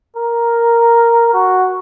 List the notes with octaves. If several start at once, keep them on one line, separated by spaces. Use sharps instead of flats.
A#4
F#4